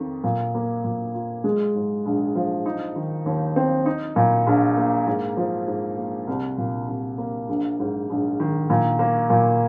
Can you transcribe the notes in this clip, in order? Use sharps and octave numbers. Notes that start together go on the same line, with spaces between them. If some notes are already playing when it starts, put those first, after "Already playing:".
Already playing: F2 D#3
A#2
A#3
A#2
F4
G#3
G#2
A#1
F3
D#4
D#3
D#2
C4
D#4
A#2
A#1
A#3
G#2
F3
G#2
A#3
C2
A#2
C2
A#3
A#1
G#2
A#1
D#3
A#2
A#3
A#2